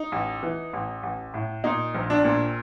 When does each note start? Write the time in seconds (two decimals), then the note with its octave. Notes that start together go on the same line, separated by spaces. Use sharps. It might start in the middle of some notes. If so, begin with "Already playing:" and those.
Already playing: D#4
0.12 A1
0.43 E3
0.73 A1
1.03 A1
1.34 A2
1.64 A#2 D#4
1.95 A#1
2.10 D4
2.24 A#2